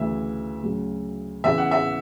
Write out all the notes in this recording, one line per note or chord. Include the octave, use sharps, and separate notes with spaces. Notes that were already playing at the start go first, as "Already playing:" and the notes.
Already playing: D2 C#3 E3 E5
D2 C#3 F#3
E2 C#3 E3 E5
F#5
E5